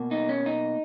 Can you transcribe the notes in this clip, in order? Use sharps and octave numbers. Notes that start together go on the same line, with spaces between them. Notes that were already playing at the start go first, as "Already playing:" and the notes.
Already playing: B2 A#3
D#4
C#4
D#4